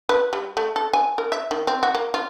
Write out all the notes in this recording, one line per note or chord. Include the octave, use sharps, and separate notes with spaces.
B4
G3
A3
A4
G#5
A#4
E5
D#3
C4
F#4
A#3
F4